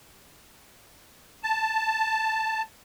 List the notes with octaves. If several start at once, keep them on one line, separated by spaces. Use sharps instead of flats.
A5